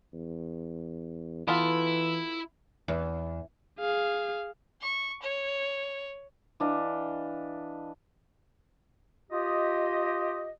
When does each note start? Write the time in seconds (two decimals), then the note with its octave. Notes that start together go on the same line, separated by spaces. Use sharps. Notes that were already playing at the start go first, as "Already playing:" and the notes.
0.14 E2
1.48 E3 B3 E4 F4 A4
2.88 E2
3.79 G#4 F5
4.81 C#6
5.23 C#5
6.60 E3 D4 D#5 F5
9.31 F4 G4 D#5